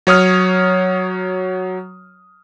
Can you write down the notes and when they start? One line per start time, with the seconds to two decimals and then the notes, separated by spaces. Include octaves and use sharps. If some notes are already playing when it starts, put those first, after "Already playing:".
0.07 F#3 C#5 D#6 F6